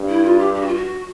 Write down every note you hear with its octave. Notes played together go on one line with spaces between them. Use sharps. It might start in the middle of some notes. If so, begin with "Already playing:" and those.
Already playing: G2
E4
F4
G4
G4
F#4
F4
F#4